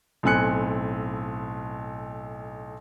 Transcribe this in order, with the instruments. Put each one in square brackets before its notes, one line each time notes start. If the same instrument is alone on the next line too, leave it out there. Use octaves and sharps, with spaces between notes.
[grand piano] B1 A2 C4 G#5 F#6 C#7